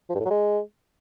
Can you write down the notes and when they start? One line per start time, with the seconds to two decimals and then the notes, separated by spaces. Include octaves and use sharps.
0.10 F3
0.15 G2
0.20 A2
0.25 F#3
0.31 G#3